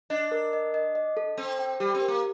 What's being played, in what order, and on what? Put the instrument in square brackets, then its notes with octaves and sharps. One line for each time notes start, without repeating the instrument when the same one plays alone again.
[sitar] D4 [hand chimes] D#5
[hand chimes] A#4
D#5
D#5
D#5
A4
[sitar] C4 [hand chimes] A4
[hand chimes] G5
[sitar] G3 [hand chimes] G4
[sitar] C4
[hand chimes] A#4
[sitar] A#3